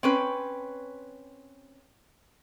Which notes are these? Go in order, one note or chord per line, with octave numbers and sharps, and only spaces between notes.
C4 C#4 B4